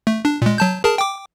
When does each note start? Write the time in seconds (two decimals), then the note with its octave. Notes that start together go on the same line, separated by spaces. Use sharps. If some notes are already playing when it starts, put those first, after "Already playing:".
0.07 A3
0.25 D4
0.42 A#2 G#3
0.58 F#3 A5 G6
0.84 G#4 A#4 A5
0.98 G5 D6